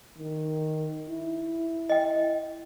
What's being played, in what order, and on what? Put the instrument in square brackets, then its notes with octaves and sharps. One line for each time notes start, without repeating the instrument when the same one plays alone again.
[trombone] D#3
E4
[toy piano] D#5 G5